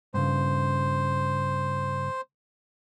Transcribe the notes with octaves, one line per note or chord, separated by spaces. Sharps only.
G2 A#2 C#3 C5